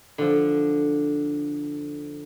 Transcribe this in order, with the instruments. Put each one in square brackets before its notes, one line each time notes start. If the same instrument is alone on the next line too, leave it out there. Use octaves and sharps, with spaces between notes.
[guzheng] D3 F3